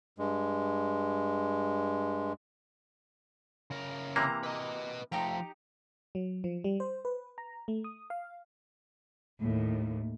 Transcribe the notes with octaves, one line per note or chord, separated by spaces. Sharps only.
G2 G#3
C#3 A#4
C3 E3 A#3 A#5
B4 D#5
F3 A3 D#4 G4 A#5
F#3
F3
G3
C5
B4
A#5
A3
D#6
F5
D#2 A2